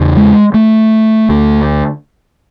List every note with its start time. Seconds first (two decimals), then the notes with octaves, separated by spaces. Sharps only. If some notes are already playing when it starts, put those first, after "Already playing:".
Already playing: E2 C#3
0.17 G#3
0.54 A3
1.29 D2 D3